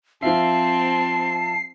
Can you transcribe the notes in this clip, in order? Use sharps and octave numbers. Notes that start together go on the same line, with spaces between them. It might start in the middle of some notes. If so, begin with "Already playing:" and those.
F3 C4 F4 E5 A5 C7